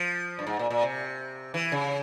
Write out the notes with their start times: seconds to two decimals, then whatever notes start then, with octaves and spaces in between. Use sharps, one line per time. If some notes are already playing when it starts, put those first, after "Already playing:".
Already playing: F3
0.39 G2
0.47 G#2
0.59 A#2
0.70 A#2
0.83 C3
1.54 E3
1.72 C#3